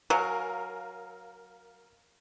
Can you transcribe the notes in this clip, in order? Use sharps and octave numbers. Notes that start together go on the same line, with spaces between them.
F#3 A#4 F5 G#5